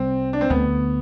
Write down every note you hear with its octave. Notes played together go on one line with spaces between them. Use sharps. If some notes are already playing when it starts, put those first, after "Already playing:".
Already playing: C2 C3 G3 C4
D4
C4
D2 D3 A3 B3